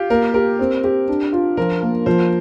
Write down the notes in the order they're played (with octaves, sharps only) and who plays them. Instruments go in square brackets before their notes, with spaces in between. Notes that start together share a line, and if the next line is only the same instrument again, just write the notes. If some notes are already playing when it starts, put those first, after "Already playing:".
Already playing: [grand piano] F4 G4
[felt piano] A#3 [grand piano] A#4
[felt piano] G4 [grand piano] A#4
[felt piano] C4
G4
D4
F4
[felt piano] F3 [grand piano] A#4
[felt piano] A#3
[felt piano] F3 [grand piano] C5